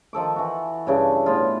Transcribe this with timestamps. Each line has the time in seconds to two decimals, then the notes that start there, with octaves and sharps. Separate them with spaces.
0.13 D#3 F3 A4 D6
0.36 E3 F#4
0.87 G2 C#3 D4
1.26 A2 B3 F4